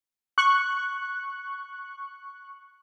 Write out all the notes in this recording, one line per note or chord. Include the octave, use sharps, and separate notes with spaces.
C#6 F#6